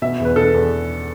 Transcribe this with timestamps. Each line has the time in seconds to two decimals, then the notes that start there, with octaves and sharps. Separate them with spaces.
0.02 B2 E5
0.20 E2 B4
0.36 B2 A4
0.54 E2